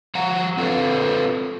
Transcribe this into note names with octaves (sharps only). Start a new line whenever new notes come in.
F3 F#5 A#5
C4 F4 A4 B4 C#5